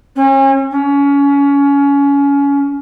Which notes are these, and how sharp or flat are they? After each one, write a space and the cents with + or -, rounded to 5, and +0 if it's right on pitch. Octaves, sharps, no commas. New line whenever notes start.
C#4 -40
C#4 +25